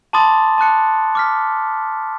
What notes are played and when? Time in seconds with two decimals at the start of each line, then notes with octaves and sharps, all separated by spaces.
0.13 A5 B5 C6 D6 D#6 A6
0.58 A5 D6 F#6 C#7
1.15 D6 F6 B6